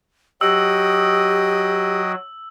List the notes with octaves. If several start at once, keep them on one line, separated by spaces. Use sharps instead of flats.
F#3 F#4 G4 D#5 G5 D#6 E6